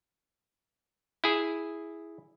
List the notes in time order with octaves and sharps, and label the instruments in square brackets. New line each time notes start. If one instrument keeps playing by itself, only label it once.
[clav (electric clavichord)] E4 G#4